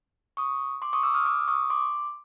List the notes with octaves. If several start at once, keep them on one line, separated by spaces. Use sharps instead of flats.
C#6 D#6
C6 D6
C#6 D#6
D6 E6
D#6 F6
D6 E6
C#6 D#6
C6 D6